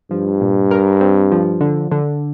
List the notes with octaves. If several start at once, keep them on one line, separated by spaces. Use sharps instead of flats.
G2 F3
A#2
A#4
C4
F3
D3
D3